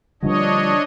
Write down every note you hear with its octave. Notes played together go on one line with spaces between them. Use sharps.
D3 F3 G3 D4 C#5 D#5